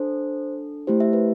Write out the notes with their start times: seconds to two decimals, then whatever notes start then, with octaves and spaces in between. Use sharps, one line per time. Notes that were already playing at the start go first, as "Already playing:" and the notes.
Already playing: D4 A4 C5
0.87 A3 E4 G4 C5
1.00 E5
1.13 B4